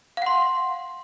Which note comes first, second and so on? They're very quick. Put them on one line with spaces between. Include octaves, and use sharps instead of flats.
F5 F#5 C6